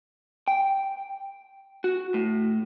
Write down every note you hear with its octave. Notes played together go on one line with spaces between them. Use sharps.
G5
F#4
A2